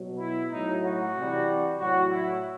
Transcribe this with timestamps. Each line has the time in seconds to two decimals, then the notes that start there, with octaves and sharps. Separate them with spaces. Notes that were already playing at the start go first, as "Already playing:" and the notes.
Already playing: B2 F#3
0.19 E4
0.50 A2 F#3 D#4
0.83 F#4
1.14 C3 E3 G3
1.78 A2 F#3 F#4
2.10 E4